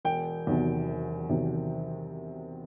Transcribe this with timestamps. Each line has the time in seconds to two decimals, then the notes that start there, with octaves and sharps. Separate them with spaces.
0.05 E1 G5
0.47 E2 C3 D#3 F#3
0.88 E1
1.29 E2 C3 D#3 F#3